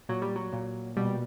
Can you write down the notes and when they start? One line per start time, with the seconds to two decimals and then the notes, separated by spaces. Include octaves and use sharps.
0.09 A#2 F#3
0.22 G3
0.36 F#3
0.53 A#2
0.96 B2 G3